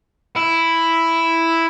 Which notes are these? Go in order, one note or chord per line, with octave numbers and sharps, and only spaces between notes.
E4